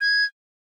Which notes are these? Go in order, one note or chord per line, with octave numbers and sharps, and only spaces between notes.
G#6